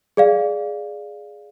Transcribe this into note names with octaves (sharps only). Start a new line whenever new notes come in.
G#4 D5 F5